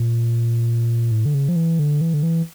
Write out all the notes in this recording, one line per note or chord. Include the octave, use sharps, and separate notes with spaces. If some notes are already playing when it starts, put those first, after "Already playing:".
Already playing: A#2
A2
D3
C#3
F3
E3
D3
E3
D3
E3